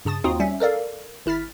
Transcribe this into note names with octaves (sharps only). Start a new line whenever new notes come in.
G2 C#3 A5 D#6 A6
D#2 C4 D#4 F4 F#4 D#6
G3 C#4 E5
A4 A#4 D5 F5
G#1 E4 F6 A6 B6